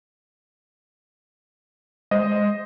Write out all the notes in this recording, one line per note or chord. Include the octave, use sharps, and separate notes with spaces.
G#3 C5 D#5